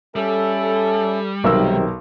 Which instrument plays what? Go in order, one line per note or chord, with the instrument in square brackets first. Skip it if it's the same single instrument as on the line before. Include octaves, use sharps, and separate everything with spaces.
[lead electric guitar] G3 [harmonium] C#4 E5 [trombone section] A4
[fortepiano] B1 A#4 E6 [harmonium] C3 D#3